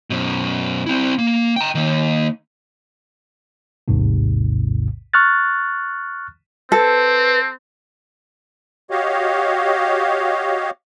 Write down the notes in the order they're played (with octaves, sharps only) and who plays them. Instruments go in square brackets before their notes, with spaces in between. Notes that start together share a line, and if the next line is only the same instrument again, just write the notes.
[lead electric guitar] F#2 B2
C4 E4
A#3
G5 A#5
D#3 A#3
[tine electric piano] A1 D#2 G#2 C3
C#6 F6 F#6 A6
[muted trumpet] C4 [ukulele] A4 [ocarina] B4
[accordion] F#4 G4 C#5 D#5 F5